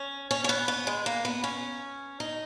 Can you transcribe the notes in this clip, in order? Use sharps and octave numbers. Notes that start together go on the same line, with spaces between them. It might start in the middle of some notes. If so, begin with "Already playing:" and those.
Already playing: C#4
C#4
C#4
B3
B3
G#3
A#3
B3
C#4
D#4